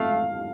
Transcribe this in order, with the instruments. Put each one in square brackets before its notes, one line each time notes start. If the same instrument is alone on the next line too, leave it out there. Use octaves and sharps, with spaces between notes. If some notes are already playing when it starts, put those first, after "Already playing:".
Already playing: [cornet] A3 [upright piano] F5